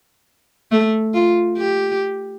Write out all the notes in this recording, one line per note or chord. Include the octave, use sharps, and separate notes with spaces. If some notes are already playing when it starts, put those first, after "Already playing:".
A3
F4
G4